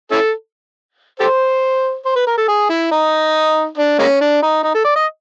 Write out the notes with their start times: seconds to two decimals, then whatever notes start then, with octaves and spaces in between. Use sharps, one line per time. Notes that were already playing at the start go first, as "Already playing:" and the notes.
0.11 C#4 E4 A4
1.20 G4 A4 C5
2.05 C5
2.16 B4
2.27 A#4
2.37 A4
2.48 G#4
2.69 E4
2.91 D#4
3.78 D4
3.99 G#3 A#3 C#4
4.21 D4
4.43 D#4
4.64 D#4
4.74 A4
4.85 D5
4.95 D#5